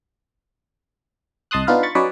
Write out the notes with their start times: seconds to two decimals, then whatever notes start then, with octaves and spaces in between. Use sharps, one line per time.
1.51 C2 D#5 A5 C6 D#6 F#6
1.67 B3 D4 D#4 F4 B4 F5
1.83 B5 C#6 A6
1.95 F#3 C#4 D#4 B4 C#5 D5